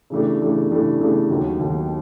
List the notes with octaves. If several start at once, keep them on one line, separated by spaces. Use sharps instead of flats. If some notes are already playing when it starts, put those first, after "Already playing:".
C#3 E3 A3 D4 G4
C#3 E3 A3 D4 G4
C#3 E3 A3 D4 G4
C#3 E3 A3 D4 G4
D#2 D#3 F#3
D#2 D#3 F#3